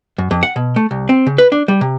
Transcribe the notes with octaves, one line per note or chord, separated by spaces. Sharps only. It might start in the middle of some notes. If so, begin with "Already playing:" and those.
F#2
F2
F#5
B2
A3
C2
C4
C#3
B4
D4
G3
C3